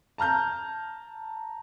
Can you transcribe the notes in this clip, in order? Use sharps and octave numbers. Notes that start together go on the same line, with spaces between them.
A5 A#5 F6 G6